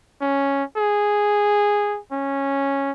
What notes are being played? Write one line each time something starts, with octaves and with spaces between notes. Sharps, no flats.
C#4
G#4
C#4